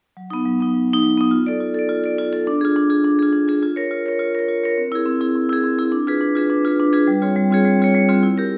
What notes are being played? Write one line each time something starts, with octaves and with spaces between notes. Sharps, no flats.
F#3
B3 D#4
F#3
B3 D#4
F#3
B3
D#4
F#3
B3 D#4
F4
A4 D5
F4
A4 D5
F4
A4 D5
F4
A4 D5
D4
F4 G#4
D4
F4 G#4
D4
F4 G#4
D4
F4 G#4
F4
A#4 C#5
F4
A#4 C#5
F4
A#4 C#5
F4
A#4 C#5
C4
E4 G#4
C4
E4 G#4
C4
E4 G#4
C4
E4 G#4
D4
F4 G#4 B4
D4
F4 G#4 B4
D4
F4 G#4 B4
D4
F4 G#4 B4
G3
C4 F4 G#4 C#5
G3
C4 F4 G#4 C#5
G3
C4 F4 G#4 C#5
G3
C4 F4 G#4 C#5
E4
G4 A#4